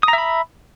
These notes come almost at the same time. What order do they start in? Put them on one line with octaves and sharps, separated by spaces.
D#6 A#5 E5 B5